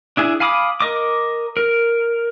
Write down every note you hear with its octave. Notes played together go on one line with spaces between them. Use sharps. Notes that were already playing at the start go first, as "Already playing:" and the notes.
D4 E4 G#4
F5 G#5 B5 D6 D#6
A#4 D#5 D6
A#4